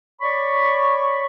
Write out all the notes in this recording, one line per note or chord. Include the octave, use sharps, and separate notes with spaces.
C#5 D5 B5 C#6